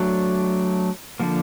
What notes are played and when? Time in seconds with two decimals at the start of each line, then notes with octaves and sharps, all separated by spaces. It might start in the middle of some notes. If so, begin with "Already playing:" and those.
Already playing: F#3 A3 D4
1.20 D3 F3 A#3